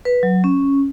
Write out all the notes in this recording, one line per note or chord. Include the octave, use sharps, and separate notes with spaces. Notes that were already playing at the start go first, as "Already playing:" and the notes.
B4
F#3
C#4